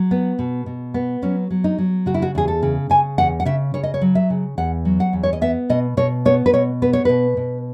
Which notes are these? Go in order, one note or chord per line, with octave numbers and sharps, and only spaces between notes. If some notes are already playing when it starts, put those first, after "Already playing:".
Already playing: F#3
B3
B2
B2
B3
F#3 C#4
F#3
D#4
F#3
C#3 F#4
E4
F#4
E2 G#4
A4
C#3
C#3 G#5
E2 F#5
F#5
C#3 E5
C#3 C#5
D#5
C#5
F#3
E5
C#3
E2 F#5
F#3
F#5
E2
C#5
D#5
B3 E5
B2 D#5
B2 C#5
B3 C#5
B4
B2 C#5
B3 B4
C#5
B2 B4
B2